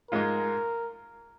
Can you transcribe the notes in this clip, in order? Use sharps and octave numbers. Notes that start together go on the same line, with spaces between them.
G#2 G#3 F4 A#4